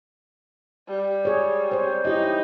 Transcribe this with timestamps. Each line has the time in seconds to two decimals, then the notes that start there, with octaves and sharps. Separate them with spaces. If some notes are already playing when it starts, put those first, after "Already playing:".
0.89 G3
1.25 G#4 C#5
1.72 C5 C#5
2.05 D#4 E4 G4 D#5